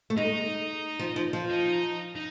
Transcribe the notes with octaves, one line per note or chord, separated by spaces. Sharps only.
A3
G#3 D#4
F3
F3
F3
D#4
D#4